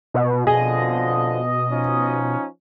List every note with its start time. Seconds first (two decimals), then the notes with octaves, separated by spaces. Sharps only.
0.14 B2
0.47 F2 B2 D3 F3 G#4 D#5
1.71 F3 C#4 D#4